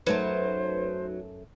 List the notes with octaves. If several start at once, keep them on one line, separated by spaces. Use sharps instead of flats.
F#2 F#3 A3 D#4 B4 C5 A5